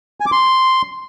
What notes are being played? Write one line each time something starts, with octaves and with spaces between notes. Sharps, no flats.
G#5
D6
C6